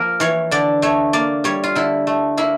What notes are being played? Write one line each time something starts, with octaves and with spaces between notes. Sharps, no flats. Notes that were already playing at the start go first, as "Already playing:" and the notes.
Already playing: F3 A#3 A#4
E3 C#5
D3 D5
A3 C#5
A#3 D5
G3 C#5
F4
D3 E4
A3
A#3 E4